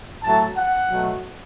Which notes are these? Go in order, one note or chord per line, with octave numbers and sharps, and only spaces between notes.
A2 F#3 A3 A5
F#5
B2 F#3 A3